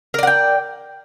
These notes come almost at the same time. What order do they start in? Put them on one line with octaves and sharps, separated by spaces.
A#4 D5 F#5 G5